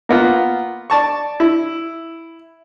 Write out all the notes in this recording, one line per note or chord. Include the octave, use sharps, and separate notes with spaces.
A#3 B3 F4
D5 A5 C#6
E4